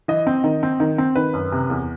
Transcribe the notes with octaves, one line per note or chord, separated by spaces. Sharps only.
E3 D#5
C4
D#3
C4
D#3
C4
D#3 B4
F#2
C3
E2